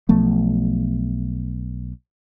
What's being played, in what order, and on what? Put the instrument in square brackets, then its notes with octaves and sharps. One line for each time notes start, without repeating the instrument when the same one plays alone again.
[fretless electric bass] B1 F3 A3 B3